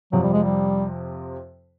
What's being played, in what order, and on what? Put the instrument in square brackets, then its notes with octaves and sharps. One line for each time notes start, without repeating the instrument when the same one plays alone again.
[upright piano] F2 C3 F3 [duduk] F#3
[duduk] G3
G#3
G3